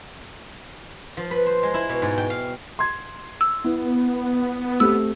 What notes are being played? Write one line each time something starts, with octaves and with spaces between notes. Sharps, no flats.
F3
B4
C5
G#3
E4
B2
G#2
G5
F5
C6 G#6
E6
B3 E4
A3 C4 G4 E6